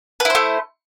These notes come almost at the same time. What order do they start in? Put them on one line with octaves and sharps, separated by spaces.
B4 E4 C5 A3